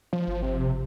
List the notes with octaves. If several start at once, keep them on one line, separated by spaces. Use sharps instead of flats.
F3
G1
C3